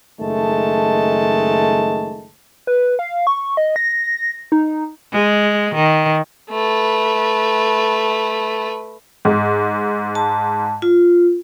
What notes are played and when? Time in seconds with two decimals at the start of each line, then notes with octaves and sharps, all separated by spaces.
0.21 F#1 D#3 G#3 A3 A5
2.67 B4
2.99 F5
3.27 C#6
3.57 D#5
3.76 A#6
4.52 D#4
5.13 G#3
5.75 D#3
6.50 A3 B4
9.25 G#2
10.15 A5
10.82 F4